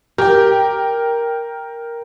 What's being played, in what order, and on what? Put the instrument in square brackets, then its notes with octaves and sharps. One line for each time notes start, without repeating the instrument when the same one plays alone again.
[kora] G4 [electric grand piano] A#4 G5